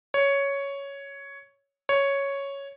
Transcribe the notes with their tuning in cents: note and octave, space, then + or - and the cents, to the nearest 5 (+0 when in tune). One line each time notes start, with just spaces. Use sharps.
C#5 +5
C#5 +0